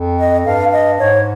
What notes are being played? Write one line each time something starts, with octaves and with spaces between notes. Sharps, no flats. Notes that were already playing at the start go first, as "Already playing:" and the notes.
Already playing: F2
D#5
G2 F5
D#5
G#2 C#5